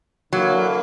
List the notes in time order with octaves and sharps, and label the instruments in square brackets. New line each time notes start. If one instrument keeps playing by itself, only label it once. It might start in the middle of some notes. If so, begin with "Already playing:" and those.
[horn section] D3 A#3 E4 [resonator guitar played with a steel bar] F#3